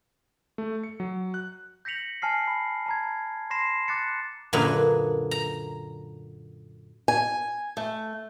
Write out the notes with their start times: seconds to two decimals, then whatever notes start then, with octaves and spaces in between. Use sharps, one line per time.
0.58 A3
0.84 C#7
1.00 F#3
1.34 F#6
1.85 G6 A#6 B6 C#7 F7 F#7
2.22 G#5 A5 F6 C7
2.48 B5
2.86 A5 A#5 G#6
3.50 B5 C6 A#6 C7 E7
3.88 D6 F#6 A6 C#7
4.53 F#2 A#2 D3 A#3 G#4 B4
5.31 A#5
7.08 G#5
7.77 A3